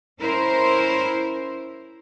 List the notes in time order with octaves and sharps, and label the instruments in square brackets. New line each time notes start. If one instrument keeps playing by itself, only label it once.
[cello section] C#4 E4 A#4 C5